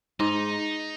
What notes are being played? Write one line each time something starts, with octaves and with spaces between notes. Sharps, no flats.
G#2 D#4